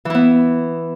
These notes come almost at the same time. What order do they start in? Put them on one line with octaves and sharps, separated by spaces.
E3 E4 B3